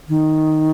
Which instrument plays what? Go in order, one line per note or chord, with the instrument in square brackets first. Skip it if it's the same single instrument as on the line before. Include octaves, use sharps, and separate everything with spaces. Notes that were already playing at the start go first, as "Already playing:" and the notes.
[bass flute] D#3